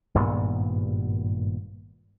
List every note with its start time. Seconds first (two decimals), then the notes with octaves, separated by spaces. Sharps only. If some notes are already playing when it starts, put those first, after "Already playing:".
0.14 G#1 G2 A#2 B3